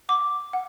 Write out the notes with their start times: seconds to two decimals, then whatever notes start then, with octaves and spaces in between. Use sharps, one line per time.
0.09 F#5 D6
0.53 F#5